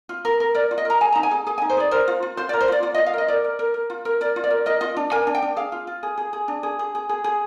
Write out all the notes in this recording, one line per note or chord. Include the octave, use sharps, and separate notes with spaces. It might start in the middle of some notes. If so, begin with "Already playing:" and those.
F4
A#4
A#4
A#4 D5
F4
D#5
A#4 A#5
G#4 G#5
A#5
D#4
G#5
G#4
G#4 G#5
G#5
D#4
C5
G#4 D5
A#4 C5
F4
F4
F4 C5
D5
A#4
C5
F4 D5
F4 D5
D#5
F4
F5
A#4 D#5
A#4 D5
A#4
A#4
A#4
F4
A#4
A#4 D5
F4
D5
A#4
A#4 D#5
F4 D#5
D4
A#4 G#5
D4
G5
D4
G#4 F5
F4
F4
G#4
G#4
G#4
D4
G#4
G#4
G#4
G#4
G#4